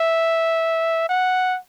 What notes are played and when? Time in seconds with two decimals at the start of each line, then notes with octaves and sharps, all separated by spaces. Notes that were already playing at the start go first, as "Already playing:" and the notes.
Already playing: E5
1.09 F#5